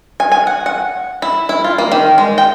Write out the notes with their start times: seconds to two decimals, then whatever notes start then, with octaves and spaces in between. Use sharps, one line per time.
0.20 G#5
0.32 G#5
0.47 F#5
0.66 F#5
1.22 E4
1.49 E4
1.64 F4
1.78 A#3
1.92 D#3
2.18 G#3
2.38 G5